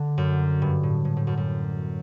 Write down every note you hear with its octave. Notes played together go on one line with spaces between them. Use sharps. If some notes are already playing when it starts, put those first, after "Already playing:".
Already playing: D3
F#2
G2
A2
A2
A2
F#2
F#2